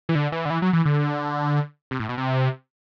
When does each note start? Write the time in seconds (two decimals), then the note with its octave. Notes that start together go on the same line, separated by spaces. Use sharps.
0.09 E3
0.15 D3
0.32 E3
0.45 D3
0.50 E3
0.62 F#3
0.73 E3
0.86 D3
1.91 C3
2.00 A2
2.09 B2
2.18 C3